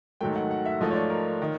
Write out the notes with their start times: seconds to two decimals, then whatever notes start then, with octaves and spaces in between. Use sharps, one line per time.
0.21 G#2 D#3 F#3 A3 G5
0.36 F#5
0.51 F#5
0.66 E5
0.80 G#2 F3 A3 D#5
0.91 C#5
0.95 D5
1.10 A#4
1.42 D#3